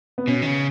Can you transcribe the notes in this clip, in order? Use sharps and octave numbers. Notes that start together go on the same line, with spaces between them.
B3
B2 C#4
D#3
C#3